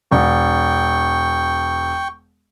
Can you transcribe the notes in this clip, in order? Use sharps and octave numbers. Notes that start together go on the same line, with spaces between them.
E1 G5 C#6